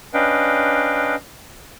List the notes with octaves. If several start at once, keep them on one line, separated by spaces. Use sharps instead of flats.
C#4 D4 B4 D#5 F5 G5